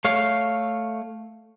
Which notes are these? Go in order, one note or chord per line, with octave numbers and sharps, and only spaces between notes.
A3 C#5 F5